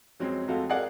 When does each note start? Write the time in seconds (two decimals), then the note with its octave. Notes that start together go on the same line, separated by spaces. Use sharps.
0.20 F2 F#3 G#3 C4 C#4
0.48 F2 G#3 A3 F#4 F5
0.70 G#4 A#4 D5 F5 F#5